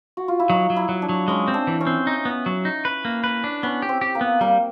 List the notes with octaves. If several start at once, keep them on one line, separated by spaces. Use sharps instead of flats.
F#4
F4
E4
F#3 D#4
F#3
E4
F#3
D4
F#3
G#3 C#4
C4
D4
E3
C#4
C4
D#4
B3
F#3
D#4
B4
A#3
B4
D4
B3 C#4
G4
C4
G4
A#3
B3
G3 A#3